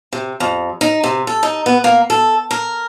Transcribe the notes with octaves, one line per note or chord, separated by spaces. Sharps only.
C3
F2
D#4
C3
A4
D#4
B3
A#3
A4
A#4